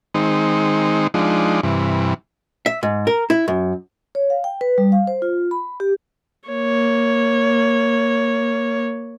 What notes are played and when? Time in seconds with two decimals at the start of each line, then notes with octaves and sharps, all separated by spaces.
0.14 D#3 G#3 C4 D#4
1.14 F3 G#3 D4 D#4
1.63 G2 C3 E3
2.66 E5
2.83 G#2
3.07 A#4
3.30 E4
3.48 F#2
4.15 C#5
4.30 F5
4.44 G5
4.61 B4
4.78 G3
4.92 F5
5.07 C5
5.22 F4
5.51 B5
5.80 G4
6.49 A#3 C#5